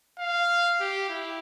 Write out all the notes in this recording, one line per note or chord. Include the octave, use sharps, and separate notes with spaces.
F5
G4
E4